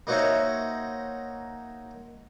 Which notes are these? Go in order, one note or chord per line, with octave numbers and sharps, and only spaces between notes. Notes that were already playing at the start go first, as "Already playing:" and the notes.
A#3 D#4 F#4 C5 C#5 E5